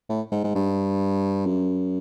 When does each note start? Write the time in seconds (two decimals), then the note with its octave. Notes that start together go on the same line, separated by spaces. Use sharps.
0.10 A2
0.32 G#2
0.44 G#2
0.55 G2
1.46 F#2